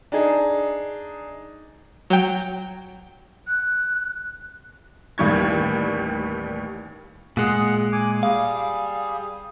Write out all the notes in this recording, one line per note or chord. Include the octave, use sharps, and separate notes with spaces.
D4 D#4 G#4
F#3 G5
F#6
A1 D#2 D#3 G3 C#6 G#6
A#2 G#3 G#4 F#5
G#5 D6
G3 G#4 F5